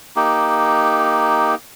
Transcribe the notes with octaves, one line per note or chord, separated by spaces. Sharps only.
A#3 D#4 G4